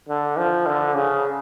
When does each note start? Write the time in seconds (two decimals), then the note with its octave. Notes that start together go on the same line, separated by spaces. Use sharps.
0.09 D3
0.38 F3
0.66 D3
0.95 C#3